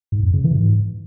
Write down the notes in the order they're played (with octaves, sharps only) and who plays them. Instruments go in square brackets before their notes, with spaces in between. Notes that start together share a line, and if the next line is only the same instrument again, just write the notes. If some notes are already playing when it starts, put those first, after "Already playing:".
[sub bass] G#2
F2
C#3
E3
G#2